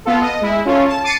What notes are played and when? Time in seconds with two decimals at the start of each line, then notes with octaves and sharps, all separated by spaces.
0.05 B3 F4 A4
0.21 D#5
0.41 G#3 E4
0.65 C#4 F4 A4 C#5
0.88 A5
1.04 D6 A6 C7 C#7 D#7